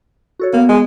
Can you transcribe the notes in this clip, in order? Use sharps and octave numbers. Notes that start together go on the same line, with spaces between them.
F#4 A4 C#5
A#3 B3
G#3